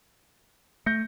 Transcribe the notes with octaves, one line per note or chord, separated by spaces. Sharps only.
A3 G6 A#6 C#7